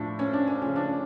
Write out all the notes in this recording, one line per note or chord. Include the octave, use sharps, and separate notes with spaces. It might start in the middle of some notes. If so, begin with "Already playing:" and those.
Already playing: A2 F3 D4
C#4
D4
C#4
C#3 F3 C#4
D4
C#4